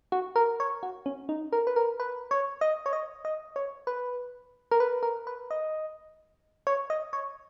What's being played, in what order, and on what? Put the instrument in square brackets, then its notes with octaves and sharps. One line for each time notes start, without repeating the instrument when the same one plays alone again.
[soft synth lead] F#4
A#4
C#5
F#4
C#4
D#4
A#4
B4
A#4
B4
C#5
D#5
C#5
D#5
D#5
C#5
B4
A#4
B4
A#4
B4
D#5
C#5
D#5
C#5